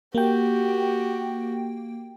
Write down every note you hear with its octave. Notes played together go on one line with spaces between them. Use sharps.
A#3 F#4 G4 G5